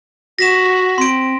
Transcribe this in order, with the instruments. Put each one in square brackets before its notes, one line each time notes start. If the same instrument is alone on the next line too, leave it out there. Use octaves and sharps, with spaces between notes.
[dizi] F#4 [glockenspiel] A#6 B6 E7
[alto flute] C4 [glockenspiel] C6 D7